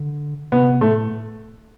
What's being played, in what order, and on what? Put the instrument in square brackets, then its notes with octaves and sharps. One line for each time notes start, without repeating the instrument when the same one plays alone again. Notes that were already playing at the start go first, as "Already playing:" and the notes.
Already playing: [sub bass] D3
[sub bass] C3 [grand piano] B3
[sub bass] A2 [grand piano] A3